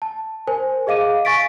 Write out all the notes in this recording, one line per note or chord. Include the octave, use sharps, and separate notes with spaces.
A5
A#4 C5 G#5
G#4 D#5 F5 D6 D#7
F5 G#5 C#6 A6 B6 D7